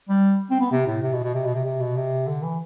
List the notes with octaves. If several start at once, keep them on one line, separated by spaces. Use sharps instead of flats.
G3
C4
B3
C3
A2
C3
B2
B2
C3
B2
C3
C3
B2
C3
D3
E3